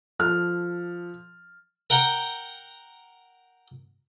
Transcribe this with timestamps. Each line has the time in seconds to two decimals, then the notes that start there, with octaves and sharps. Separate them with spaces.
0.19 F3 A4 F6
1.90 A#4 F#5 G5 A#5